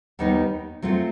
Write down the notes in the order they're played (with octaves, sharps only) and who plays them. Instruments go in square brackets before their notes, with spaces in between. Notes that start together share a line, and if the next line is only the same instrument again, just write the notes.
[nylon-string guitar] D#2 D#3 G3 B3 D#4
F#3 A3 C4 F4